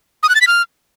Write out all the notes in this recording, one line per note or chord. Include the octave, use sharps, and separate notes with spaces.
D#6
F#6
A6
B6
F6